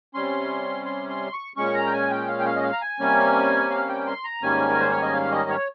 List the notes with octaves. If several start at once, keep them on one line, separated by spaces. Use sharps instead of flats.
C3 G3 C#4 C6
C6
C6
C#6
A#2 G#3 C#4 C#6
A#5
G5
G#5
G5
F5
G5
F5
D#5
F5
A#5
G#5
C3 G3 A#3 C#4
F5
G5
C6
A#5
G#2 D#3 G3 A#3 C#4 G#5
A#4
C5
C#5
D#5
F5
D#5
C#5